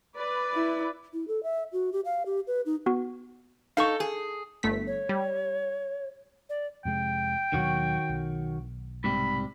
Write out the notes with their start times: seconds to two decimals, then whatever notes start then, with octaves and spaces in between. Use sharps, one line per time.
0.16 B4 D5
0.54 E4
1.13 E4
1.28 A4
1.43 E5
1.72 F#4
1.93 G4
2.05 F5
2.26 G4
2.47 B4
2.66 D#4
2.86 B3 F#4
3.77 D#4 A4 F5 C#6
4.00 G#4
4.63 G1 A3 B6
4.87 C#5
5.09 G3
6.49 D5
6.85 F2 C3 G#3 G5
7.53 D#2 B2 D#3 F#3 F#4 C#5
8.09 B1
9.04 G#2 C3 G3 B5